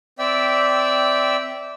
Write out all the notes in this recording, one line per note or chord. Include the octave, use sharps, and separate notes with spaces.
C4 D5 E5 G5 E6